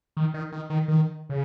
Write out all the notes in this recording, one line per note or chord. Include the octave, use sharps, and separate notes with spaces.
D#3
D#3
D#3
D#3
D#3
C#3